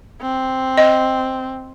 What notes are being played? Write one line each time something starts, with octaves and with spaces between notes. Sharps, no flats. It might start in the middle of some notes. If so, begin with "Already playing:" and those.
C4
D#5